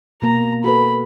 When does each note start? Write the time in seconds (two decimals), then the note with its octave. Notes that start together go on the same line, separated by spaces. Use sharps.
0.22 B2 A#3 A#5
0.64 F#4 A4 B4 B5